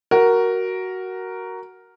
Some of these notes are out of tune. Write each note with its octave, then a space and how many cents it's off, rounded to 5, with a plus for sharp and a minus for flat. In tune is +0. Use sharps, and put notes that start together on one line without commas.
F#4 +10 A#4 +0